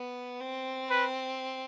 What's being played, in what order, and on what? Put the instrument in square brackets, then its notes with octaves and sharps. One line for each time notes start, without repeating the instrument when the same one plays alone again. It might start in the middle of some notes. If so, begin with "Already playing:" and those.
Already playing: [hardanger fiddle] B3
C4
[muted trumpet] B4